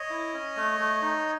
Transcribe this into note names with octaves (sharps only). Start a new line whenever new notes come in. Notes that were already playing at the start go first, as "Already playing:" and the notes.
Already playing: C#5 D#5
E4
C#4
A3
A3
D#4